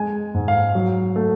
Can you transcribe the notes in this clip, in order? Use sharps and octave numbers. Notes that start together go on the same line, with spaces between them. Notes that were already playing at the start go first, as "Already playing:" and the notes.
Already playing: G#3 G#5
G#2
F5
F#3
A3